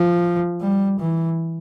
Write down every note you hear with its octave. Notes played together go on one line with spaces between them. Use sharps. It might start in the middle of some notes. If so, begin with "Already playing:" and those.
Already playing: F3
G3
E3